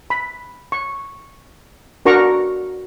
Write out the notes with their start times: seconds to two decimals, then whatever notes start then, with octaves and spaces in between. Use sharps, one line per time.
0.10 B5
0.72 C#6
2.06 D4 F#4 A#4 A#5 C#6 D6